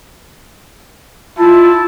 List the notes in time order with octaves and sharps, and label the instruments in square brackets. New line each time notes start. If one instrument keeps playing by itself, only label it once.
[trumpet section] E4 A5 [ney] F4